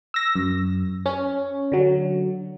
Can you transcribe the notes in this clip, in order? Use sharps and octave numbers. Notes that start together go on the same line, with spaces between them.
E6 A#6
F#2
C#4
D3 F#3